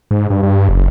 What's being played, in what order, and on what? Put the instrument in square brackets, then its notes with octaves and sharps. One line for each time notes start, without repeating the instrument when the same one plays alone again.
[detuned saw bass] G#2
G2
G2
F#1